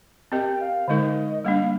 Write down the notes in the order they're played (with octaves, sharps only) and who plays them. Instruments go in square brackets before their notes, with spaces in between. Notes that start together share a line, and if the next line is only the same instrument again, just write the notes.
[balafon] C4 G4 A#4 D#5 [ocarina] G5
[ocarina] F5
[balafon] D3 G#3 D#4 A#4 [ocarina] D#5
[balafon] G3 A#3 D4 [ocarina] F5